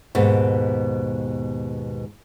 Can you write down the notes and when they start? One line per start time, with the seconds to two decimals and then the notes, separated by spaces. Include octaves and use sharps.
0.15 D#2 G#2 B2